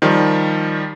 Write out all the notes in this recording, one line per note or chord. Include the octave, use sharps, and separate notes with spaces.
D#3 F3 G3